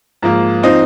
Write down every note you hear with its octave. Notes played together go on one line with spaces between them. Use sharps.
G#2 F3 A#3
F3 C4 D#4